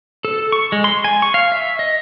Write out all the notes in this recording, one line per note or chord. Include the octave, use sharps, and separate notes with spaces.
A4
C#6
G#3
C6
G#5
C#6
F5
E5
D#5